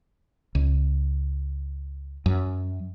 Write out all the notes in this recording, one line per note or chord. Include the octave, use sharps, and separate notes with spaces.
C#2
F#2